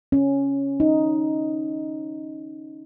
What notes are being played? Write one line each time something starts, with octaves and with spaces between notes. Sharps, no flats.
C#4
D#4